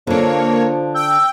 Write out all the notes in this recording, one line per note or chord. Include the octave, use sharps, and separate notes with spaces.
D3 F3 A#3 D4 C#5
G5 E6